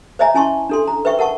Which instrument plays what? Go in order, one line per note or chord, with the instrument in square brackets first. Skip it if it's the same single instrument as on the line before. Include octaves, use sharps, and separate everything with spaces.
[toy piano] C5 C#5 D#5 E5 G#5 A#5
C#4 E4 G#5 A5 C6 C#6
D4 A4 C6
A#5
B4 C5 E5 G5 C#6
A#4 F#5 A5 C#6